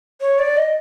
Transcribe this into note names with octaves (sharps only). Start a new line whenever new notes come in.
C#5
D5
D#5